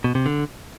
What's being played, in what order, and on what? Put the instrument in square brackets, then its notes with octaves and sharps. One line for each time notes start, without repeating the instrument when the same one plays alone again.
[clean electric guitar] B2
C3
D3